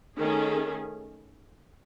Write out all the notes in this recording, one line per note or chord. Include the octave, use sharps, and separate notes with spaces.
D#3 A3 C#4 G#4